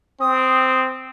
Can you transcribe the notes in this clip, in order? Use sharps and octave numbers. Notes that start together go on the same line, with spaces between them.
C4 D#6